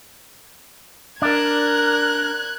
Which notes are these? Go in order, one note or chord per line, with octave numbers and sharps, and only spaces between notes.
D4 A#4 F#6 G#6